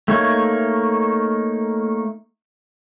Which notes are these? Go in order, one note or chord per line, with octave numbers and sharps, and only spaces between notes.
A3 A#3 D#4 C#5